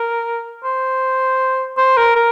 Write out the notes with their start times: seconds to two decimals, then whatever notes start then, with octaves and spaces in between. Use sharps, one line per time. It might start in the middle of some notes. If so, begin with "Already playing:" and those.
Already playing: A#4
0.64 C5
1.77 C5
1.97 A#4
2.16 A#4